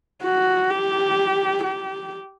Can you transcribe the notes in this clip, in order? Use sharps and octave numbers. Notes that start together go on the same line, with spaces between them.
F#4
G4
G4